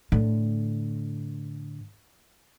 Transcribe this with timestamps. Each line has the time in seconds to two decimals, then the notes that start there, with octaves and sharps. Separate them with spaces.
0.12 A2 D3